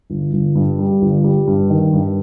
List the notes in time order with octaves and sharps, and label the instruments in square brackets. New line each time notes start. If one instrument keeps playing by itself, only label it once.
[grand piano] G1
G1
G2
G3
G1
G3
G2
D#3
G2